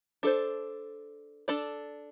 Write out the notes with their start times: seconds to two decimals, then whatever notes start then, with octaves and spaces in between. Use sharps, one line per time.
0.23 D4 A4 C5
1.48 D4 A4 D5